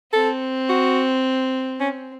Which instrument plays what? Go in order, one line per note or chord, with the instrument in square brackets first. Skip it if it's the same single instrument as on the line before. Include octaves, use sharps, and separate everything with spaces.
[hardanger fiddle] C4 [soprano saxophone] A4
[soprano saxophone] F#4
C#4